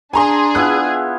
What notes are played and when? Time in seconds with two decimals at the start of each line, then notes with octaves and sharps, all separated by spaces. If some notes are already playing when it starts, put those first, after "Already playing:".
0.13 D4 G#4 G#5 A#5 C6
0.55 B3 E4 F4 F#6